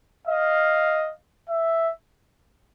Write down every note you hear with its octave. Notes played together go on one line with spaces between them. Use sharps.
D#5 F5
E5